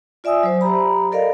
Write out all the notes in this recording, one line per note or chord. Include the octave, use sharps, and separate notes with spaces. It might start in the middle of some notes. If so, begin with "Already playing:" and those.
F4 D5 E5 G#5 D#6 E6
F#3 C5
G4 A#5 B5
A4 A#4 D5 D#5 F5